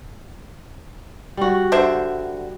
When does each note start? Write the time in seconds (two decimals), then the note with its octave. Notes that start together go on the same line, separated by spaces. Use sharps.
1.37 G3 F#4
1.72 D3 C5 E5